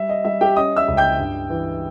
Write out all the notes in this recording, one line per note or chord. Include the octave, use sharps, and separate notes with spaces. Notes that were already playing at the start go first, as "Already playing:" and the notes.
Already playing: G3 E5
D#5
G3 E5
G4 G5
C#4 D#5 D#6
E5 E6
C#2
G5 G6
G2
E3